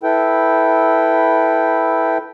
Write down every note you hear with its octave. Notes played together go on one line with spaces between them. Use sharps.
E4 A4 B4 G5